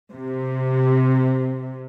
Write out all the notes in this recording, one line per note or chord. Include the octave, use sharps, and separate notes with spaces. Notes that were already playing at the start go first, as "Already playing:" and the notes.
C3